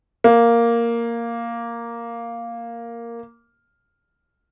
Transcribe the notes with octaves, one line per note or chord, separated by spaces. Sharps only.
A#3